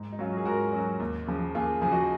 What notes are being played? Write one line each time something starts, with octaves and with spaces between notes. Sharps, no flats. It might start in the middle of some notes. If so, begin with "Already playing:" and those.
Already playing: G#2
D#4
F#3 C#4 F4
F#4
G#4
G#2 F#4 A#4
F#3 C#4
D#2
C#3 F3
D#2 F4 G#4
C#3 F3 G#4
D#4 F#4